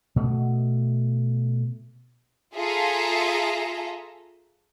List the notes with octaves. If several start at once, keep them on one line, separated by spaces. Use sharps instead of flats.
B2 A3
F4 G#4 A4 E5 A#5